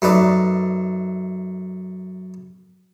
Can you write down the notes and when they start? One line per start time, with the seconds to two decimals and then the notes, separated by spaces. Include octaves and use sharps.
0.02 F#2 A3 D#4 B4 D5